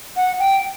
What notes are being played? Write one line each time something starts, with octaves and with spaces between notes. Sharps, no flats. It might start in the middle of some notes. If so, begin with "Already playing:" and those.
F#5
G5